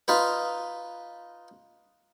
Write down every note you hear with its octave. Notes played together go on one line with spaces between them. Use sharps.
D#4 F4 B4